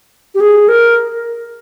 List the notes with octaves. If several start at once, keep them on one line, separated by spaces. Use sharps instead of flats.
G4
G#4
A#4